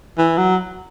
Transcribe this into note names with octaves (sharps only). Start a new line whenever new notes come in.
E3
F#3